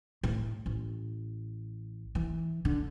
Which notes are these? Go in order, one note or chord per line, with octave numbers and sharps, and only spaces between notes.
A2
A1
E3
D3